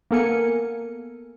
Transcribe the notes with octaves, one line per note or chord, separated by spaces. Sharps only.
A#3 B3 A4 A#4 G#5 C#7